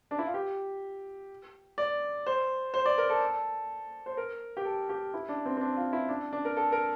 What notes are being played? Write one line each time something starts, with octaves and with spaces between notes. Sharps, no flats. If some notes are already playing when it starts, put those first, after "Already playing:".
D4
E4
F4
G4
D5
C5
C5
D5
A#4
A4
C5
A#4
G4
A4
G4
E4
D4
C4
C4
D4
F4
E4
D4
D4
A#4
A4
A#4